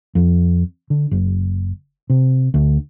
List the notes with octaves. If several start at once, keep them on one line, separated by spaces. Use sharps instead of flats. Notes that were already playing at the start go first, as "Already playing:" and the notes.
F2
D3
F#1
C3
D2